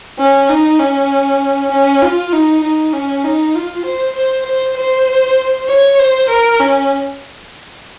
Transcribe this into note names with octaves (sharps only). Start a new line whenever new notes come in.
C#4
D#4
C#4
C#4
F4
D#4
D#4
C#4
D#4
F4
C5
C5
C5
C5
C#5
C5
A#4
C#4